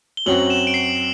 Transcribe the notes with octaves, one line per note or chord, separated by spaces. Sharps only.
G7
F#2 F#3 C4 F#4 F#7
E7
D7
C7